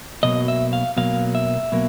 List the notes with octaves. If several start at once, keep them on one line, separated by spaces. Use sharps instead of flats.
B1 B2 F#3 A#3 D#5
E5
F5
B1 B2 F#3 A#3 F5
E5
B2 F#3 A#3